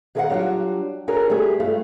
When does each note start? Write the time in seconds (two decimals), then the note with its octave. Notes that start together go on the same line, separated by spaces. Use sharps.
0.15 D#3 G#4 A4 D5 F5 F#5
0.30 F#3 G3 D4 F4 F#4
1.08 D4 F#4 G#4 A#4 C#5
1.30 G3 A3 G4 G#4
1.60 G2 A3 F4